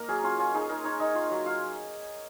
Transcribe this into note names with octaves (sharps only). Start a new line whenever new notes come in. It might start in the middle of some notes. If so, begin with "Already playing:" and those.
Already playing: A#3 D#4 A#4
F#3 G#4
C#4 F4
C#4 F4
D#4 G#4
D#4 A#4
D#4 C#5
D#4 D#5
F4
F#3
F4 F5